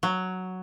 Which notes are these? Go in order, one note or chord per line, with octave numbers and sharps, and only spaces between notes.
F#3